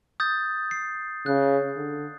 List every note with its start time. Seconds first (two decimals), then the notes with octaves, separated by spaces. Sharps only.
0.20 D#6 G6 A6
0.71 C7
1.26 C#3 F#6
1.76 D3